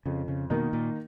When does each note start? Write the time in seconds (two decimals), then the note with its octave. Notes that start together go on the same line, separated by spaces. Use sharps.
0.06 F2 C#3
0.28 C#3
0.50 B2 D#3 A#3 D#4
0.73 A#2